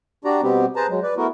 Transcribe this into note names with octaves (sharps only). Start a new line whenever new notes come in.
D4 F#4 G4 D5 A#5
B2 G3 B3 C4 G4
G#4 B4 C5 A5 A#5
F#3 G#3
B4 D5
A3 B3 E4 F#4 A#4